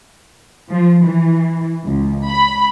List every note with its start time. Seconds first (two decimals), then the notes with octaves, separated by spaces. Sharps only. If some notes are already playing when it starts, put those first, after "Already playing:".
0.70 F3
1.06 E3
1.86 C#2
2.29 B5